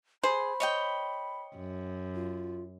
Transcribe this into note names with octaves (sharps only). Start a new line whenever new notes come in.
G#4 C5 B5
C#5 D#5 G5
F#2
F4